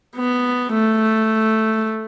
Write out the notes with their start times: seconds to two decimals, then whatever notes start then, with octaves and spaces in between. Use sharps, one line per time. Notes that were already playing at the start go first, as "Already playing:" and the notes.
0.17 B3
0.73 A3